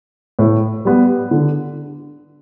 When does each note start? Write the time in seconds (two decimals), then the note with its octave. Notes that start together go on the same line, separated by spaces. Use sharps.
0.39 A2
0.85 G3 B3
1.31 D3